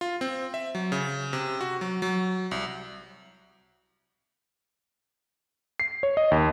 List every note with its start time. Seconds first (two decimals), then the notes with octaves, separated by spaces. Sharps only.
0.01 F4
0.21 C4
0.54 E5
0.75 F#3
0.92 C#3
1.33 C3
1.61 F#4
1.81 F#3
2.02 F#3
2.51 C2
5.80 C7
6.03 C#5
6.17 D#5
6.31 D#2